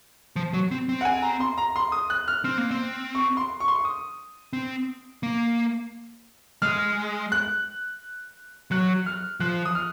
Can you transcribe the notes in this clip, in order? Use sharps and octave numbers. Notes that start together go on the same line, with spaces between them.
F3
F#3
C4
C4
F#5
G#5
A#5
C6
A#5
C6
D#6
F#6
F6
C4
A#3
C4
C#6
C6
C#6
C6
C#6
D#6
C4
A#3
G#3 F6
F#6
F#3 F#6
F6
F3 F#6
D#6
F6